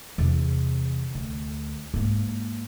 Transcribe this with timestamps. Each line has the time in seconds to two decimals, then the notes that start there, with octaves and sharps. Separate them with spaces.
0.18 E2 C3
1.15 D2
1.94 G#2 A#3